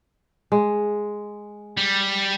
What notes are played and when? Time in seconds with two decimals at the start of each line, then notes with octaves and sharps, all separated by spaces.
0.52 G#3
1.77 G3